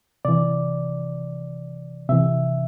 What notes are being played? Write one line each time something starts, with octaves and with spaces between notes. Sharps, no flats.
C3 E3 D5
C3 E3 E5